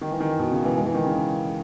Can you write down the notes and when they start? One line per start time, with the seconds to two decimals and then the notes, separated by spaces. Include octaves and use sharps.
0.01 D#3
0.11 E3
0.20 D#3
0.39 B2
0.51 C#3
0.64 E3
0.77 G#3
0.85 E3
0.94 D#3
1.05 C#3